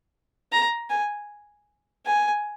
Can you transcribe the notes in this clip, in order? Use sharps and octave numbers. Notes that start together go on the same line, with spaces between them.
A#5
G#5
G#5